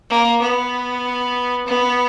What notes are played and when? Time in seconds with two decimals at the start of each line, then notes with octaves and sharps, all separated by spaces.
0.10 A#3
0.42 B3
1.67 B3